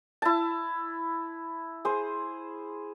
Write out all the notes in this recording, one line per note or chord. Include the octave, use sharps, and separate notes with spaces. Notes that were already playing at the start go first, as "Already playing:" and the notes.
E4 A5
G#4 C5